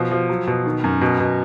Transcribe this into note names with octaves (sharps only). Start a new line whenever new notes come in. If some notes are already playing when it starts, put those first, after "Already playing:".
Already playing: B2 F3
F3
F#3
B2
D#3
F#2
B2
B2